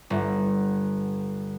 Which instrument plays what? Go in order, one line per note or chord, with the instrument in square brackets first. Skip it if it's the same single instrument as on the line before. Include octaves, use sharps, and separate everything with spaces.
[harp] G1